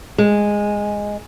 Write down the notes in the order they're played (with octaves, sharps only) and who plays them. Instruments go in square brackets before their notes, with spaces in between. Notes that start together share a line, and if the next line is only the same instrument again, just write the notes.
[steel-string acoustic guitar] G#3